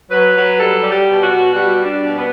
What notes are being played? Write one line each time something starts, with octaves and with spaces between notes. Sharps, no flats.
F#3 B4
F#3
G3 A4
G3
G4
B2
F#4
B2
G3 F#4
G3
D4
B2
B3